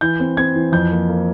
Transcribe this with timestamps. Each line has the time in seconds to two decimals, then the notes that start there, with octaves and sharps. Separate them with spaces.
0.01 E3 G6
0.20 C4
0.37 C4 G#6
0.56 E3
0.72 F2 G6
0.91 A#3
1.09 A#3